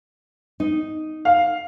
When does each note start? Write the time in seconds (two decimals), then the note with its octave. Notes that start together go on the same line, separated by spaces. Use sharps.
0.60 D#4
1.25 F5